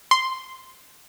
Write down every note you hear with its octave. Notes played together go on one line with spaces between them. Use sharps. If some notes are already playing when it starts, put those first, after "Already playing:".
C6